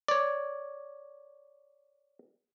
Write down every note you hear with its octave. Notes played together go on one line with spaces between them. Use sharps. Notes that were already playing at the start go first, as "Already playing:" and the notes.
C#5 D5